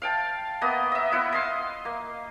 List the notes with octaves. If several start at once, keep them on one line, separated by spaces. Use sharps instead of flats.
F5 G5 A5
A#3 B3 D#5
D#5 E5
B3 E4 F#5
D#5 F5 C6
A#3